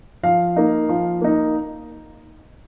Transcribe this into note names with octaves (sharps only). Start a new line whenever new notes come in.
F3 F5
A#3 D#4
F3
A#3 D#4